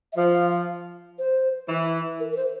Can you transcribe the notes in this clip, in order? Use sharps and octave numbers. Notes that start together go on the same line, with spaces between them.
E5
F3 F5
C5
E3
A#4
A#4
C5